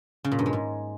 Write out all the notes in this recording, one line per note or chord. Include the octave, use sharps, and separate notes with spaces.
C#3
A#2
G2
G#3
G#2